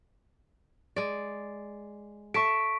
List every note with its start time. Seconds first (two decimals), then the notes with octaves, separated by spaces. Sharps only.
0.96 G#3 D5
2.34 A4 E5 C#6 B6 D7